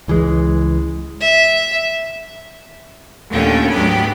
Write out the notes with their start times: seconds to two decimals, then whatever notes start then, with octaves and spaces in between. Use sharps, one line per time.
0.08 C#2 E3 F#3 G#3
1.21 E5
3.30 D#2 A#2 D3 A3 C#4 G5
3.71 D2 G#2 F#3 B3 G4 B5